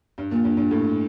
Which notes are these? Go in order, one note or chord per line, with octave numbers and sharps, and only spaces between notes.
G2
A#2
G2
G2
A2